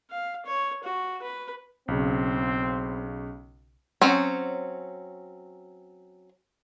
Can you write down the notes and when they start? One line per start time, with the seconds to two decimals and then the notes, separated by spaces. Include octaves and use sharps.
0.11 F5
0.46 C#5
0.84 F#4
1.22 B4
1.88 B1 C#3 C4
4.01 F#3 C4 C#4